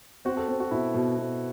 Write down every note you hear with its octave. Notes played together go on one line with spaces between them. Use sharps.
C4 F#4
A4
C4
F#4
B2 E4
B2
B2